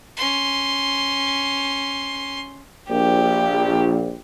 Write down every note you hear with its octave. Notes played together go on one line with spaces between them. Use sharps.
C#4 C6
A#1 G4